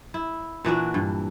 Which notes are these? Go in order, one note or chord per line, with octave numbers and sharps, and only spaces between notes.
E4
A#2 E3 D4 F#4
G2